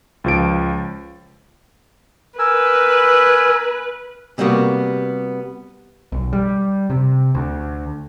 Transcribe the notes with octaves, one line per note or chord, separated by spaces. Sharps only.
C#2 F3 D7
A#4 B4 G#5 E6
C3 G3 A#3 B3 F#4
B1
G3
C3
D2